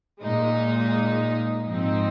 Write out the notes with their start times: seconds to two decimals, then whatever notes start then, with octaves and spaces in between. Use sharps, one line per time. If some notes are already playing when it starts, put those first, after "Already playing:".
0.21 A#2 G#3 D#4
1.66 G#2 F3 C4 D#4